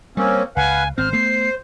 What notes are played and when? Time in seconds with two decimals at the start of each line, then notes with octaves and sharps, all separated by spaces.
0.17 G3 A#3 C4 C#4
0.56 C#2 B4 F5 F#5 G#5
0.98 G#1 C4 C5 F6
1.13 A3 B3 C7